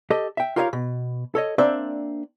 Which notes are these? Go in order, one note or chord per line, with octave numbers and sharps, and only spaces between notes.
G4 A4 D#5
E5 G5
F4 G4 A#4 C#5 D#5 F5
B2
A4 C#5 D#5
A#3 C4 D4 C5 D5 E5